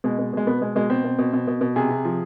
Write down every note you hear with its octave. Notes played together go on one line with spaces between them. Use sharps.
B2 G#3
B2
B2 G#3
B2 B3
B2 G#3
B2 G#3
B2 C4
B2
B2
B2
B2
B2
C3 G#4
C3
F3